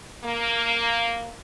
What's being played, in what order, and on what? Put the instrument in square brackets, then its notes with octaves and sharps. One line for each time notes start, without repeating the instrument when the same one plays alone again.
[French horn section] A#3